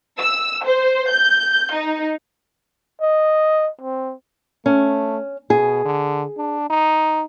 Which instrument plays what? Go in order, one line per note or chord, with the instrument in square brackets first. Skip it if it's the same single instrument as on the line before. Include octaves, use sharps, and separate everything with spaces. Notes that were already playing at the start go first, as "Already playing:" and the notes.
[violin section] E6
C5
G6
D#4
[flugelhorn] D#5
C4
[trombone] A3 [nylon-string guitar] C#4
[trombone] B2 [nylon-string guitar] G#4
[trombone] D3
D4
D#4